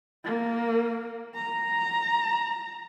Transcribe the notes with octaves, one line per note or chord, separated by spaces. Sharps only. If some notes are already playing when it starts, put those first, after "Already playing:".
A#3
A#5